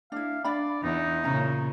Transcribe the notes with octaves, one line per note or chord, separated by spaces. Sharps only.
D4 E4 F5
D4 D5 F5 B5
E2 D#4
A#2 C#3 C#4 A#5